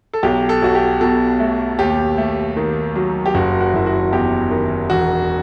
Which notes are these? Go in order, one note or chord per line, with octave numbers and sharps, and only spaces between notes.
A4
B1 G4
A4
B1 F#4
G4
B2 A4
A3
D#2 G4
A3
D#3
F#3
G4
F#1 F#4
F#4
F#1 E4
F#4
E2 G4
D#3
E1 F#4